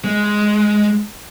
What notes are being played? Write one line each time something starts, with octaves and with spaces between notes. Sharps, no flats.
G#3